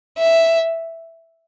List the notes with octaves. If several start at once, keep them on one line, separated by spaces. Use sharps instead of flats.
E5